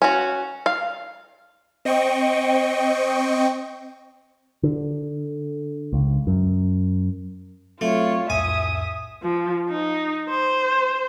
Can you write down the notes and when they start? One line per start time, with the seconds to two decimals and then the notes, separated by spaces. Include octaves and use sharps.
0.02 C#4 F#4
0.66 F5
1.85 C4 D#5 G5 C#6
4.63 D3
5.93 C#2
6.27 F#2
7.81 F#3 A3 C4 F4 C#5
8.30 C2 F2 A2 E5 G#5 D#6
9.22 F3
9.69 D#4
10.29 C5